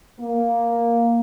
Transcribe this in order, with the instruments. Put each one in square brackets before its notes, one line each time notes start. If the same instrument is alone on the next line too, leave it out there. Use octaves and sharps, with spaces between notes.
[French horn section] A#3